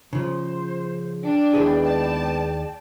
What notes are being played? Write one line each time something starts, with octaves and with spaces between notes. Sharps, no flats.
C#3 F3 C5
D4 D5 G5
D#2 G#3 B3 E4 G#4 B4
A5